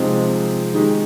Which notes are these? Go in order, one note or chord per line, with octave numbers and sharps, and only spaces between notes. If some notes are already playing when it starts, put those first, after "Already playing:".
Already playing: C3 F3 G#3 C4 D#4
D#3 G#3 D#4 G4